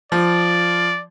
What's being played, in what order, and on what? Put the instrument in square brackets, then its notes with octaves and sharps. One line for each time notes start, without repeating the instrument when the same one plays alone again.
[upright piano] F3 [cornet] D5